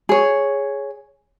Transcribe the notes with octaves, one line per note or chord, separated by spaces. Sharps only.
G#4 C#5